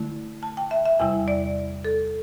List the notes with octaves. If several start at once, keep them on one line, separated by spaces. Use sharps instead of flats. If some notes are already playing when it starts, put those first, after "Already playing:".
Already playing: D3 A3 E4
A5
G5
E5
E5
E2 C3 G3 E4 G5
D5
A4